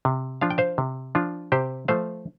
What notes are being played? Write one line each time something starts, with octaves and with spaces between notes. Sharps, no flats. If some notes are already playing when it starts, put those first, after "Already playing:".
C3
F3 D4 F4 F5
G5
C5 F5
C3
F3 D4 F4
C3 G4 C5
F3 A3 C5 F5